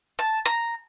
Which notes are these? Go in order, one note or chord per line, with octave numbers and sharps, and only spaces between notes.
A5
A#5